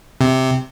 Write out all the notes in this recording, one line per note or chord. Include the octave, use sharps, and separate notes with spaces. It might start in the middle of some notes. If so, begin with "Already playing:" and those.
C3